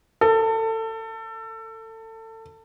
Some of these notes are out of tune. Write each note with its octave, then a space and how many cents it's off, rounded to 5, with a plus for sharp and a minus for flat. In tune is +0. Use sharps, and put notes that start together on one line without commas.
A4 +25